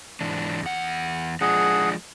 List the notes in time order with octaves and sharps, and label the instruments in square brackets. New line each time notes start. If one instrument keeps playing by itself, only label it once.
[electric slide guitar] G#2 E3 D4
E2 F#5
[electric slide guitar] F3 G#3 D4 [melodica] G#4 F#5